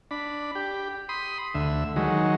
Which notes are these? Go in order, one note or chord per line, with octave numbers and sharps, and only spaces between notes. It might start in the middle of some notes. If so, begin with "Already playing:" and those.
D4 B5
G4
B5 C6 D#6
D2 E5
D#3 F#3 G#3